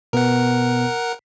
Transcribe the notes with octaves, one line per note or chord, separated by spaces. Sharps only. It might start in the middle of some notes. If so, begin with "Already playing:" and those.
B2 B3 A#4 F#5